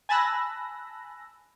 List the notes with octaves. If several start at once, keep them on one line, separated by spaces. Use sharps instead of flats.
G#5 A5 B5 E6 F#6 A#6